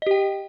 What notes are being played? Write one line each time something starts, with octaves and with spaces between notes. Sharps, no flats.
G4 D#5 G5